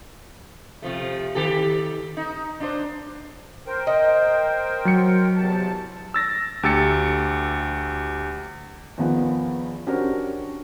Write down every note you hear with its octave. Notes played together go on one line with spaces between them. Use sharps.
C3 F3 A3
D#3 G4 A4
D#4
D4 F4 C5
A#4 C5 G5
D#5
F#3 C#7
E2 C3 A5
E6 A6 A#6
D2 G4 E6 A6 C#7
E2 D#3 F3 B3
C#4 D4 F#4 G4 A#4 C5